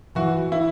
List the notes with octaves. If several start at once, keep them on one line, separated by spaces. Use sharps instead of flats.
E3 F#4
E4